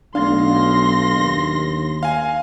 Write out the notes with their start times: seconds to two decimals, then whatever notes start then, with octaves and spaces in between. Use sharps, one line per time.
0.15 B1 A3 D4 F5 C6 A#6
1.17 D#2
2.03 F5 G#5